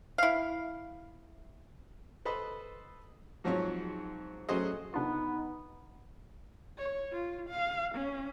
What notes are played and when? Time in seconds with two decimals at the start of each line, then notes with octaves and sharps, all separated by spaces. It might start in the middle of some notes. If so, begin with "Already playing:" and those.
0.18 E4 F5
2.25 A4 B4 C5 D#5 B5
3.44 G#2 F3 F#3 C4 C#5
4.49 F#3 A3 C#4 G#4 C5 D#5
4.94 C3 B3 D4 D#4 F4
6.78 C#5
7.12 F4
7.49 F5
7.95 C#4